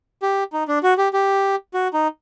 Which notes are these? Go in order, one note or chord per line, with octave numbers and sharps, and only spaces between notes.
G4
D#4
D4
F#4
G4
G4
F#4
D#4